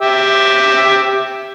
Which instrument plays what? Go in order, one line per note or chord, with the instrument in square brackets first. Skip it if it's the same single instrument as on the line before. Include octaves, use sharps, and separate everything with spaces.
[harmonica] G4 E5